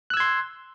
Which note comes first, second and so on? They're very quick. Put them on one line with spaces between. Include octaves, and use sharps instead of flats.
F#6 E6 G#6 C6